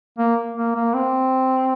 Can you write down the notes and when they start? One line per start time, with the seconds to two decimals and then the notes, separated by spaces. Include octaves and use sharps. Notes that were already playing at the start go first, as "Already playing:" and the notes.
0.18 A#3
0.57 A#3
0.75 A#3
0.94 C4